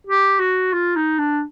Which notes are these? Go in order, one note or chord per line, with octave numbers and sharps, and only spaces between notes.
G4
F#4
F4
D#4
D4